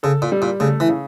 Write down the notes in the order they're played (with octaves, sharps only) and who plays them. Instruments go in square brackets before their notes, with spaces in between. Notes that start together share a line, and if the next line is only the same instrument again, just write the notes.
[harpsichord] C#3 [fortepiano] A4
[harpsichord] A#2
[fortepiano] G3
[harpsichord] A#2
[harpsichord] C#3 [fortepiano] A3
[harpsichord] E3
[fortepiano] C#3